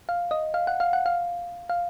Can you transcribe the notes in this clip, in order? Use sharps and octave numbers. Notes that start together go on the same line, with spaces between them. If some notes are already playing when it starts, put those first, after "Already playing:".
F5
D#5
F5
F#5
F5
F#5
F5
F5